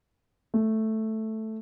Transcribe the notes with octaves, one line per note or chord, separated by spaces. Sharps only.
A3